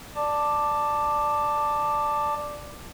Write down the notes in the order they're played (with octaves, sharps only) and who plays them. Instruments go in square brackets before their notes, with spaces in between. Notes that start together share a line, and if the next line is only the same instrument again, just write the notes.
[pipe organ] D5 A5 D6